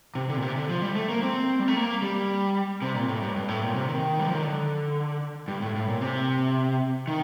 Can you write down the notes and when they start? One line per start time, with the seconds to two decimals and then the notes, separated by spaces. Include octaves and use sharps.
0.15 C3
0.29 D3
0.37 A#2
0.42 C3
0.56 D3
0.69 F3
0.82 G3
0.96 A3
1.09 A#3
1.23 C4
1.59 G3
1.68 A3
1.76 A#3
2.02 G3
2.82 C3
2.95 A#2
3.09 A2
3.22 G2
3.36 G2
3.48 A2
3.62 A#2
3.75 C3
3.89 D#3
4.19 G3
4.26 F3
4.34 D#3
4.42 D3
5.48 G2
5.62 A2
5.75 A2
5.88 A#2
6.01 C3
7.08 D#3